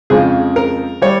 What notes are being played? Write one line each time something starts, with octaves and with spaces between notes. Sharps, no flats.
F2 C#3 F3 G#3 G#4
A#4
G3 C#5